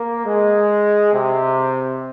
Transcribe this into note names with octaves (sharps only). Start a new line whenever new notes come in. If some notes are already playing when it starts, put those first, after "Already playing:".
Already playing: A#3
G#3
C3